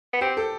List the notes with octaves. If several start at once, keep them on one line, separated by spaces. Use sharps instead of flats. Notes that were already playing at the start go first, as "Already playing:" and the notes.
B3
C4 G4
A4